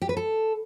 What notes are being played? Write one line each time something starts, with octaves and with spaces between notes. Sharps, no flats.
G4
B4
A4